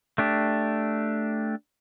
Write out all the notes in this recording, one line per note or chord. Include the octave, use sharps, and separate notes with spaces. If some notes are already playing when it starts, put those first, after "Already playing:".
A3 D4 G4